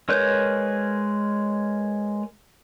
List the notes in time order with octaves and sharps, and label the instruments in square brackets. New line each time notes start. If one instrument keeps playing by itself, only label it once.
[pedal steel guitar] G#3 A#4 B4 C#5 G6